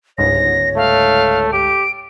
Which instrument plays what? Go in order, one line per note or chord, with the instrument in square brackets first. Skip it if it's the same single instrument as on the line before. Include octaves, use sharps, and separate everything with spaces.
[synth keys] G1 C#2 G#2 [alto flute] C#5 [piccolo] A#6
[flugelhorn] A3 [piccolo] F5
[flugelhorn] G4 [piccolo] D7